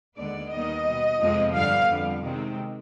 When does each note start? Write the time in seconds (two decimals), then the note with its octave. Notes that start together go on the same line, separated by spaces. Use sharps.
0.17 D#2 D3 G#3 B3 D5
0.51 D#2 D#3 G3 B3 D#5
0.85 B2 B3
1.20 F2 C3 F3 G#3 C4
1.54 G2 D3 G3 B3 F5
1.89 F2 D3 G3
2.22 C3 D#3 G#3 C4